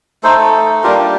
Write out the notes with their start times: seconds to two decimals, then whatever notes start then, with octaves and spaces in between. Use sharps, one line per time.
0.23 A3 D#4 A4 C5
0.38 A4
0.84 G3 A#3 D4 F4 G4 A#4
0.99 G4